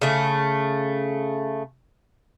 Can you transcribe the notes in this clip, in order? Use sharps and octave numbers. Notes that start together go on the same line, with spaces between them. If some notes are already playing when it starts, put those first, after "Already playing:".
C#3 A3